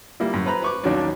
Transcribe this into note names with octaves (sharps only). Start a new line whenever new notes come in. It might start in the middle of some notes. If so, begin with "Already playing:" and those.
G3 A#3 E4
F#2
B4 C5 A#5 B5
B4 C#6 D6
A#1 D#2 F#3 C#4 D4 D5